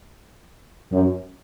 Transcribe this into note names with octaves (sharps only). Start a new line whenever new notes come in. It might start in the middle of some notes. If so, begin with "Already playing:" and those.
F#2